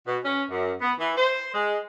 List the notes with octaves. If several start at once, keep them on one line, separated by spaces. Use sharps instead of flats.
B2
C#4
F#2
B3
E3
C5
G#3